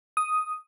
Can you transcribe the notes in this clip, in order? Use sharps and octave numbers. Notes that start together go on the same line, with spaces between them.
D#6